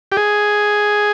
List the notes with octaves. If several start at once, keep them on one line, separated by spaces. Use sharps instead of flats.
G4
G#4